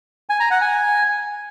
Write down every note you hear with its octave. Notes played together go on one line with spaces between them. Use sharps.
G#5
A#5
F#5
G#5